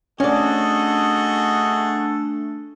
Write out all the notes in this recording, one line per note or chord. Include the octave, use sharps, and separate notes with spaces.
A3 C#4 D4 F#4 G#4 A4 D5 D#5